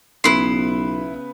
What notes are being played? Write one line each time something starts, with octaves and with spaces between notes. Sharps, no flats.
B1 C#3 B3 E4 B4 C6